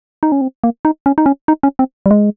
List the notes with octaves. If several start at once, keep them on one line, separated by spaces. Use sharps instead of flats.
D#4
C#4
C4
A#3
D#4
C#4
D#4
C#4
D#4
C#4
C4
G3
G#3